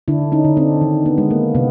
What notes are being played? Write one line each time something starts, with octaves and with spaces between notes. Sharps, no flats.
D3 D4 E4
C#4 D#4
D3
C4 D4
D#3
B3
G#3
A#3
C3 B3